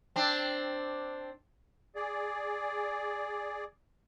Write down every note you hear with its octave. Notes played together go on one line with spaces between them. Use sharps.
C4 D4
G#4 D5